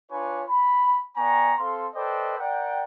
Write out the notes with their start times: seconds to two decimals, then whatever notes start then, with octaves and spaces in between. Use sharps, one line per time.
0.11 D4 F4 B4 C#5 G#5 C#6
0.49 B5
1.17 B3 D5 G5 G#5 A#5 C#6
1.58 C4 A4 F5 C6
1.95 A4 B4 C5 D5 D#5 G5
2.38 A#4 D5 F#5 G5